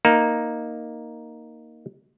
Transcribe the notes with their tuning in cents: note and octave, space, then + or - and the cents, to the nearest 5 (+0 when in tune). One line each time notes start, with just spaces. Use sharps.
A#3 +0 D#4 +0